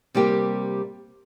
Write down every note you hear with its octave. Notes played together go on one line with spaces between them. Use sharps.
C3 G3 A#3 G4